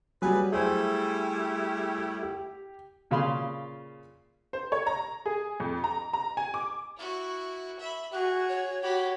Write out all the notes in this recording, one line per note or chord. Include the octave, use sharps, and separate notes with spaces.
F#3 G3 G#4 B4
G3 A3 E4 G#4 C5
G4
A#2 C#3 F4 F5 B5 C6
C5
C#5
A#5
G#4
F2
A#5
A#5
G#5
D6
E4 F#4
E5 B5
F#4 G#4 F#6
C#5
F#4 G4 B5